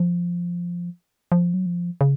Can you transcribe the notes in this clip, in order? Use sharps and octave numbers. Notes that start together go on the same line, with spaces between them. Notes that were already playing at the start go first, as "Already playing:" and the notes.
Already playing: F3
F3
F#3
F3
C#3